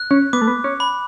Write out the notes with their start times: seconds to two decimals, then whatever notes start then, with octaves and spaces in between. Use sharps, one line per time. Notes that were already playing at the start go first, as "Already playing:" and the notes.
Already playing: F#6
0.11 C#4
0.33 B3 D6
0.41 A3
0.47 B3
0.64 C#4
0.80 B5